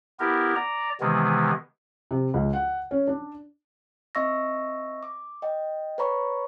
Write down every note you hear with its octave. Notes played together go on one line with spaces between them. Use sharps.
B3 E4 G4 A#4
D5 A#5
C3 D#3 E3 G#3 B3
C3
C#2
F#5
C#4
D4
C4 D#5 E5 C#6 E6 A#6
D6
D#5 G5
B4 C#5 D5 A#5 B5 C#6